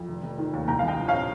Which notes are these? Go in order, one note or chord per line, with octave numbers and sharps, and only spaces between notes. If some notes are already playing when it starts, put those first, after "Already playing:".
Already playing: F2
F1
F1
D#3
D#2
C2 G5 A#5
F5
C2 D#5 G5
F3
C#5 F5
C3